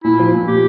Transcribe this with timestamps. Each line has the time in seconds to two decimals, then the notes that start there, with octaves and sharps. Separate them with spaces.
0.04 A#2 E4
0.19 F3
0.34 A#2
0.47 A#2 G4